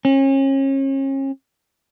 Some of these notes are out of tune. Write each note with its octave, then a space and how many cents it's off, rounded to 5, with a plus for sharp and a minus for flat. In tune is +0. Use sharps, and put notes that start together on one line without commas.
C#4 -35